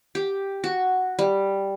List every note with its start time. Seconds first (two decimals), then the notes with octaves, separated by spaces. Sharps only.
0.15 G4
0.64 F#4
1.19 G3